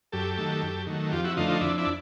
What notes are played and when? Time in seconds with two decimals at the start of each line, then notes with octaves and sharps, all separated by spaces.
0.12 F#2 G4 A4
0.37 D#3 F#3 A3
0.62 F#2
0.87 D#3 F#3 A3
1.12 F2 F4 G4
1.24 E4 F#4
1.37 D3 F3 A3 D#4 F4
1.49 D#4 F4
1.61 F2 D4 E4
1.78 D4 E4